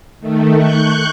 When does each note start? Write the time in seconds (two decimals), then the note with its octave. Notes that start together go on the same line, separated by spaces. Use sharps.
0.20 D#3 A3
0.56 C#6 F#6 G6